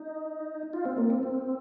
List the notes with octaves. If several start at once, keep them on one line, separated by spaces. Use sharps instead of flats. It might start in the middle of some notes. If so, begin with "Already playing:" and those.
Already playing: D#4
F4
C4
A#3
C4
C4